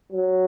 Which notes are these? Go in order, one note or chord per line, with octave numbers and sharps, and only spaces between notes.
F#3